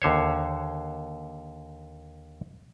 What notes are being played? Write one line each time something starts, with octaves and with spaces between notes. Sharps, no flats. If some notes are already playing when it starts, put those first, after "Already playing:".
D#2 D3 C5 C#5